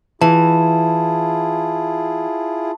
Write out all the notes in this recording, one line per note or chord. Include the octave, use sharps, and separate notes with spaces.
E3 E4 F4 G#4 A5